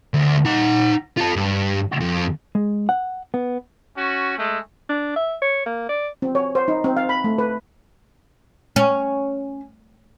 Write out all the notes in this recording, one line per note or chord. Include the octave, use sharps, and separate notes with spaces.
D2
D#4 F#5
F4 A4
G2
F2
G#3
F#5
B3
C#4 F#4
G#3 A3
D4
E5
C#5
A#3
D5
C4
C#5
C5
D#4
C4
F5
B5
A3
B4
C#4